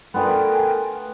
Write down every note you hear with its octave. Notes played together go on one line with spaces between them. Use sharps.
A3 B3 D4 F4 A#4 B4 G5 G#5